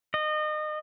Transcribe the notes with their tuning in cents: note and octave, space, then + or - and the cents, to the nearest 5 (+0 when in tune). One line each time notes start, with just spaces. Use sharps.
D#5 -30